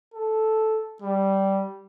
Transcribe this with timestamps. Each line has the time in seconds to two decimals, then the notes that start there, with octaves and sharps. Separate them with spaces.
0.14 A4
1.02 G3